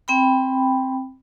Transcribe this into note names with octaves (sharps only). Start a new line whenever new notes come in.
C4 G5 B5